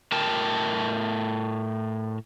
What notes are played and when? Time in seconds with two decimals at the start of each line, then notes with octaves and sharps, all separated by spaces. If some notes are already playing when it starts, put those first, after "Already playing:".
0.12 A2 A#4 G5 A5